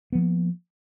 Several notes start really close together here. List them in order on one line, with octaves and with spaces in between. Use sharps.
B3 F3 A#3